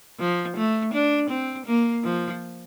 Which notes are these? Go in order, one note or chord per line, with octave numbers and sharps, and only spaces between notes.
F3
A3
D4
C4
A#3
F3